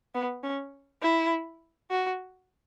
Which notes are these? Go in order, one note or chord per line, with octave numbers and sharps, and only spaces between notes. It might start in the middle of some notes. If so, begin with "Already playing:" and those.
B3
C#4
E4
F#4